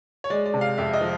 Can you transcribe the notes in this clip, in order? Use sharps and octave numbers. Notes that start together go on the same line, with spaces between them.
C#5
G#3 D5
D5
C3
F5
F2 E5
D#5
F3